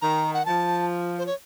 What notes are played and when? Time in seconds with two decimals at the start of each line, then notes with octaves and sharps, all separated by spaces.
0.01 D#3 A#5
0.34 F#5
0.45 F3 A5
1.18 C5
1.26 C#5